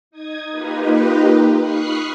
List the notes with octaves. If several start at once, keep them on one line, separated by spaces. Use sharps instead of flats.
D#4 D#6 G#6
A#3 D#4 F4 G4 B4
B5 C#6 D#6 F6 F#6 C7